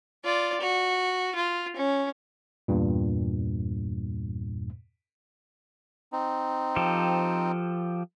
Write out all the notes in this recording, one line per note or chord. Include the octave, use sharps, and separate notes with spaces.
F4 D5
F#4
F4
C#4
E2 G2 A#2
C4 D#4
F3 G4 A4